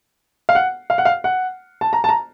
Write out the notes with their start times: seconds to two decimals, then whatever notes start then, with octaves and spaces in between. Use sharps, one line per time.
0.49 F5
0.55 F#5
0.90 F5
0.98 F#5
1.05 F5
1.24 F#5
1.81 A5
1.93 A#5
2.04 A5
2.09 A#5